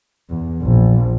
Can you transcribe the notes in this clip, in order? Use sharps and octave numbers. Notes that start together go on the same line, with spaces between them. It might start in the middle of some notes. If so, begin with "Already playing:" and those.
E2
A#1